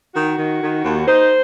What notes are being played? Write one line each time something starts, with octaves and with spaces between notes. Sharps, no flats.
D#3 F#4
D#3
D#3
D#2
D#4 C5